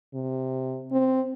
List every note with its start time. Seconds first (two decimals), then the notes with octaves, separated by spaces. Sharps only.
0.14 C3
0.92 C4